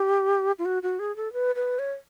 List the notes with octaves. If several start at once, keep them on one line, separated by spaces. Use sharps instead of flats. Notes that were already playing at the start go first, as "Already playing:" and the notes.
Already playing: G4
F4
F#4
F#4
G#4
A4
B4
B4
C#5